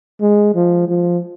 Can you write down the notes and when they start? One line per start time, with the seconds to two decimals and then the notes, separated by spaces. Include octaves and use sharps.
0.21 G#3
0.55 F3
0.88 F3